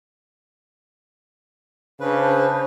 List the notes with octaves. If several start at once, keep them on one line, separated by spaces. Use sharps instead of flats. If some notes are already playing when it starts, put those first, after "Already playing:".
C#3 D4 B4 C5